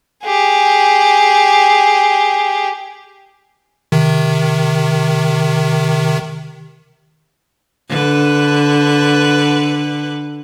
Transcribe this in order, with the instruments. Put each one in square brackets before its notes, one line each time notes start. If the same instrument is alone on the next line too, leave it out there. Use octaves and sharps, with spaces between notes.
[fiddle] G4 G#4
[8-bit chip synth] C3 D#3
[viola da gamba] D3 B4